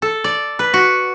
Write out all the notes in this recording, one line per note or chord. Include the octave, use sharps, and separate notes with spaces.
A4
D5
B4
F#4